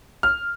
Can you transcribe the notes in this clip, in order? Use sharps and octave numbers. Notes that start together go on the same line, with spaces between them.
F6